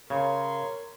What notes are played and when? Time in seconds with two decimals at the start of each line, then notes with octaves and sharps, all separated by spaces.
0.10 C#3 A#4 C#5 C6